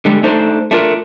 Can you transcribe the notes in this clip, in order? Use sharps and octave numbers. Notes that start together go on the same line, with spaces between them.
D3 G3 G#3
A3 D4 D#4 A4 C5 D5
A3 D4 F4 A#4